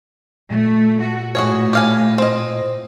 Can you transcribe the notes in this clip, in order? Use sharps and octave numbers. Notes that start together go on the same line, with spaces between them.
A#2 A3
F#4
A2 F#4 G#4 C#5
G4 F5 G#5
C4 D#5